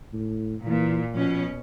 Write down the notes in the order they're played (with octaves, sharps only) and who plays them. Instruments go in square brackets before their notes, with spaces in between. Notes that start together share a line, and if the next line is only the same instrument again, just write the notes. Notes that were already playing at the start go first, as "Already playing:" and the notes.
[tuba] A2
[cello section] A#2 [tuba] E3
[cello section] B2 C#4 [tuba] F3